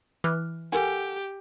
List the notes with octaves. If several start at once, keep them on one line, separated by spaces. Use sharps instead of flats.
E3 D6 F6 F#6
G4 A4 A#4 F#5 G#5